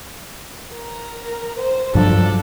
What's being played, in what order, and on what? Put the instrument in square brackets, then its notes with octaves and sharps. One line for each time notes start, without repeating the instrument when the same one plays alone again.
[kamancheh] A#4
C5
[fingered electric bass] G2 F3 F#3 [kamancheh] D4 A4